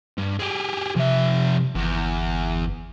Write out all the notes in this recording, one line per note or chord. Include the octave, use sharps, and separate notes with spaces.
G2
G4 G#4
F2 C3 E5
G1 E2